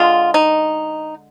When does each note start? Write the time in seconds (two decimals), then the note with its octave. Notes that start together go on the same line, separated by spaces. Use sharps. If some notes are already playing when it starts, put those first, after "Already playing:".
Already playing: D3 G#3 F4
0.34 D#4